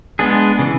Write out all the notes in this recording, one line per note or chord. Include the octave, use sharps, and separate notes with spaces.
G#3 B3 D4 G#4
C#3 E3